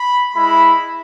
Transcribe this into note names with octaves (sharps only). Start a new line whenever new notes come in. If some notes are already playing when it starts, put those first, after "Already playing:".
Already playing: B5
G#3 E4 B5